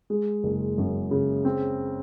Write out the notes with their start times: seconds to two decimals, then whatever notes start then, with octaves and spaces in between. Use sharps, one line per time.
0.10 G#3
0.44 F#1
0.78 F#2
1.11 C#3
1.45 C4